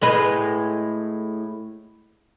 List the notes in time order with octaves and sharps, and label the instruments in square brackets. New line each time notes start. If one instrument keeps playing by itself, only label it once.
[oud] A2 G#3 B4